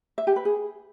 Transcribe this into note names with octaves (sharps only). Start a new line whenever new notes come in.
E5
G4
B4
G#4